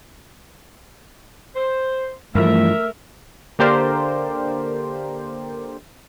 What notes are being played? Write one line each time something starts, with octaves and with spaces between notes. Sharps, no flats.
C5
G2 E3 F3 A3 A#4 E5
D3 A#3 G4 A#4 C5 D5